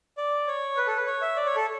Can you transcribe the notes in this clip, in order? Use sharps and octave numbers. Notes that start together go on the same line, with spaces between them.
D5
C#5
B4
A4
B4
C#5
E5
D5
C#5
A4